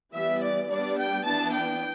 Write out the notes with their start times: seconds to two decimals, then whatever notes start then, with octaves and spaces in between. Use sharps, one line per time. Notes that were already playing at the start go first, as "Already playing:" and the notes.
0.13 E3 G3 B3 E5
0.41 D5
0.68 G3 B3 D4 D5
0.98 G5
1.25 E3 B3 D4 A5
1.53 G5